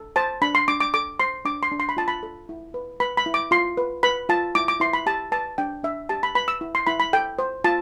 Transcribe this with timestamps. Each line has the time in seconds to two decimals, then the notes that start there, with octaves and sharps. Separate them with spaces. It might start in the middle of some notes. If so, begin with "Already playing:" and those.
Already playing: A4
0.16 C5 A5
0.42 D4 B5
0.55 C6
0.68 D4 D6
0.80 D6
0.94 A4 D6
1.20 C5 C6
1.45 D4 D6
1.63 C6
1.72 D4
1.80 C6
1.89 B5
1.97 F4 A5
2.08 B5
2.23 A4
2.49 E4
2.74 B4
3.00 B4 B5
3.17 B5
3.26 E4
3.34 D6
3.51 F4 C6
3.77 B4
4.03 B4 B5
4.29 F4 A5
4.55 E4 D6
4.68 D6
4.80 E4 C6
4.93 B5
5.06 G4 A5
5.32 B4 A5
5.58 D4 G5
5.83 D4 E5
6.09 G4 A5
6.23 B5
6.35 B4 B5
6.48 E6
6.61 E4
6.75 C6
6.87 E4 B5
7.00 B5
7.13 A4 G5
7.39 C5
7.64 F4 A5